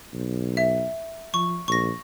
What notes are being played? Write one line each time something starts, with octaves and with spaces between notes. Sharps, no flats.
B1
E5
F3 C#6
A#1 C#6 A#6